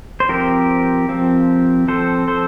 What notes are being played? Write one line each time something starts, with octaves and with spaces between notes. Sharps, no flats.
C5
F3 C4 G4 A#4
F3 C4
F3 C4 A4 C5
A4 C5